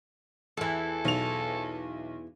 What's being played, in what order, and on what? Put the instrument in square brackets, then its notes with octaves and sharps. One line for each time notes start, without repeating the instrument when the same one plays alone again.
[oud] E2 E3 [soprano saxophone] A4
[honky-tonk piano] B1 F7